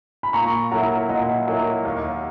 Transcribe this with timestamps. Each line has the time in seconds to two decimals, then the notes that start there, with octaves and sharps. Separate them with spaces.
0.23 B5
0.33 A#2 A#5 C#6
0.71 F#3 A#3 E4 F#5 A#5
1.09 A#2 D#5 F#5
1.47 F#3 A#3 E4
1.85 D#2